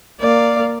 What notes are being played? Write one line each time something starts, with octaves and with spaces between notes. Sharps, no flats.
A#3 D5 F5